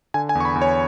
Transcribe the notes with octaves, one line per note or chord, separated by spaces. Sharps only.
D3 G#5
G#5
E2
C#6
B5
E2
C#5